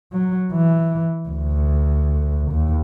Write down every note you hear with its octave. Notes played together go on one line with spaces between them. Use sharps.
F#3
E3
D2
D#2